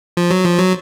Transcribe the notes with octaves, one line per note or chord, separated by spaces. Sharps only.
F3
F#3
F3
F#3